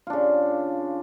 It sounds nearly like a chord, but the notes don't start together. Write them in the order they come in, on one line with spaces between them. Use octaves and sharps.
F4 D4 C#3